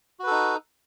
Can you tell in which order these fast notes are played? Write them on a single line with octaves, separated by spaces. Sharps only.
F#4 B4 A4 D#4